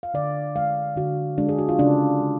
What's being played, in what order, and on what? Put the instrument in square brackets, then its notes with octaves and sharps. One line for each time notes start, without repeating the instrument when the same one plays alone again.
[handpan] F5
D3 D5
G#3 F5
D3 F#4
G#3 D4
G#4
F#4
F4
C#3 D4
G#3